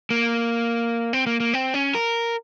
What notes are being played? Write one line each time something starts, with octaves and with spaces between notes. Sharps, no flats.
A#3
C4
A#3
A#3
C4
C#4
A#4